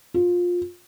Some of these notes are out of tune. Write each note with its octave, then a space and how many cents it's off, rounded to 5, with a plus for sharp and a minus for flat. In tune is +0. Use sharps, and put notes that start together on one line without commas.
F4 +20